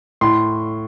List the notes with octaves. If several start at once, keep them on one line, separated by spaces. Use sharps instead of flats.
A2 C6